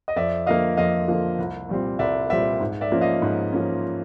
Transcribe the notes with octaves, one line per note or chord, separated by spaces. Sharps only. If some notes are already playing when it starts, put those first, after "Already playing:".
D#5
F2 D5 E5
D3 F3 A#3 D#5 F5
F2 D#5 F5
D3 F3 A#3
C2
A#2 G3 C4
C2 D5 E5
A#2 G3 C4 D5 E5
G#2
D5 E5
F3 A#3 C#4
D#5 F5
G#2
F3 A#3 C#4